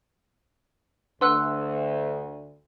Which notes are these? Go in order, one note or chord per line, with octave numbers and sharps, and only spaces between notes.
D2 D4 B4 F#5 C6 E6 F#6